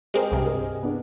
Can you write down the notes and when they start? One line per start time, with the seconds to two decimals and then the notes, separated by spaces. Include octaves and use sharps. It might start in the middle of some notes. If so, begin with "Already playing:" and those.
0.14 G#3 C4 G4 G#4 A#4
0.32 C2 G2 C3
0.45 G#4 A#4 D#5
0.82 B3 D4